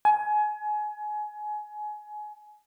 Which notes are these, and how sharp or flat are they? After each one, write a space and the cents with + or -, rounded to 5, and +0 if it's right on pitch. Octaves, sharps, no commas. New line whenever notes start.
G#5 +25